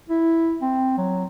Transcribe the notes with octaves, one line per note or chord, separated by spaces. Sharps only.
E4
C4
F#3